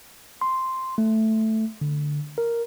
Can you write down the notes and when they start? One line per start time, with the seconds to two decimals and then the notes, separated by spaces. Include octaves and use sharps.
0.41 C6
0.98 A3
1.81 D3
2.38 A#4